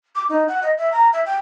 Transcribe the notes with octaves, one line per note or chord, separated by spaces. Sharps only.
D6
D#4
F#5
D#5
E5
A#5
E5
G5